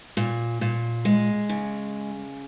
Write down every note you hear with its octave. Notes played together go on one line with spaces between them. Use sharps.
A#2
A#2
G#3
C#3